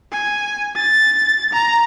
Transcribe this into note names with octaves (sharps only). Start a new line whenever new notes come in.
G#5
A6
A#5